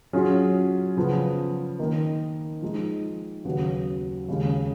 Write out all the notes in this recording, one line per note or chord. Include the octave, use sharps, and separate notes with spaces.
F#3 C#4 F4 G#4
C#3 F3 B3
D#3 A#3 D#4
F3 G#3 D#4
D#2 C#3 F#3 B3 F#4
D#2 C#3 G#3